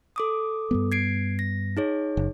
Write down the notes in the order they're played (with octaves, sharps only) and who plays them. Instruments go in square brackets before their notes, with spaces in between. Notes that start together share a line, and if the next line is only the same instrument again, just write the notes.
[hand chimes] A4 D6 D#6
[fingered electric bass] G2 G3 B3
[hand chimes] G#6 C7 D7
A#6
D#4 G#4 C#5
[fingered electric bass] F#1